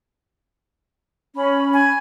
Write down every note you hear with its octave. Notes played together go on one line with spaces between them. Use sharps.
C#4 B5
G#5